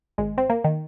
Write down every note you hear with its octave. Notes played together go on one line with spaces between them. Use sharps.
G#1 G#3
C4
A#3
D#3